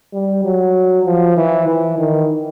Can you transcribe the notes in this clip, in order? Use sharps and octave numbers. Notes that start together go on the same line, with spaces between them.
G3
F#3
F3
E3
E3
D#3